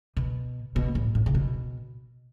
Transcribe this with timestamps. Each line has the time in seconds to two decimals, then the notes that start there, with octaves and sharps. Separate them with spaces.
0.17 B2
0.76 B2
0.95 A2
1.15 A2
1.26 C#3
1.35 B2